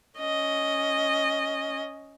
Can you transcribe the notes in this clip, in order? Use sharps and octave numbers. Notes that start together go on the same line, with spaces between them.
C#4 D#5